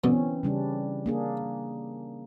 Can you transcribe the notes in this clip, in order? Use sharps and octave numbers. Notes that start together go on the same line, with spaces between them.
F#2 B2 D3 E3 C4 C#4
C#3 G3 D4
A#3 D4 G#4